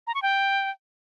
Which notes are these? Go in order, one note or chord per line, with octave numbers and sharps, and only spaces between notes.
A#5
C#6
G5